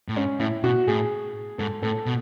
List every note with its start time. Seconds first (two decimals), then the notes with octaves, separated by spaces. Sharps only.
0.09 A2
0.15 G#2 C#4
0.40 A2 E4
0.63 B2 F#4
0.87 A2 G#4
1.59 G#2 A4
1.83 A2 A4
2.06 B2